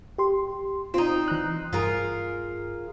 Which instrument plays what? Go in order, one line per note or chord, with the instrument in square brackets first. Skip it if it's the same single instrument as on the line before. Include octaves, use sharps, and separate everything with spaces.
[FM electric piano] G4 C6
[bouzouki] C4 D#4 [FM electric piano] F4
[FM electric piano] E3 A#5 F#6
[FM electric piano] G2 [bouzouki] F4 G#4 A#4